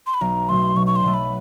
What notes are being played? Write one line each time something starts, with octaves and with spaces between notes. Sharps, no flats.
C6
B5
B1 A#5
B2 F#3 A3 C6
B1 C#6
C#6
C6
B2 F#3 A3
B5